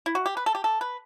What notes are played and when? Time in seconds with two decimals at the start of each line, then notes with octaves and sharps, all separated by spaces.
0.06 E4
0.15 F#4
0.26 G4
0.37 B4
0.46 A4
0.55 G4
0.64 A4
0.81 B4